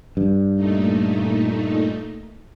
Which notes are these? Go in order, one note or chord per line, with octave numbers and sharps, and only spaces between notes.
G2
A#2 A3 D#4